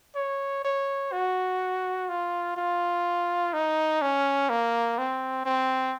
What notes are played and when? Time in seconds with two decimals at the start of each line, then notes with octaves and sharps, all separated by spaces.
0.16 C#5
0.65 C#5
1.13 F#4
2.09 F4
2.57 F4
3.53 D#4
4.02 C#4
4.50 A#3
4.99 C4
5.46 C4